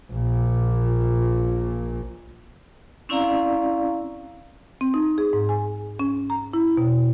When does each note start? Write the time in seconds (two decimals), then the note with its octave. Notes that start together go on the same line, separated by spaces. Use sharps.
0.13 A#1 A#2
3.09 C4 C#4 E4 D5 F5 A#5
4.81 C4
4.94 D#4
5.18 G#4
5.33 G#2
5.49 G#5
6.00 C#4
6.30 A#5
6.54 E4
6.77 B2